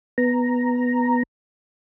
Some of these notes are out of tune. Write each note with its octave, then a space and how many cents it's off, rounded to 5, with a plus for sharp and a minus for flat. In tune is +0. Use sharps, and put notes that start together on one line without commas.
B3 +0 A#5 +0